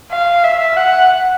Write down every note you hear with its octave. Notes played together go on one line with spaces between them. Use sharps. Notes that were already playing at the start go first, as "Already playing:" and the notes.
F5
E5
F#5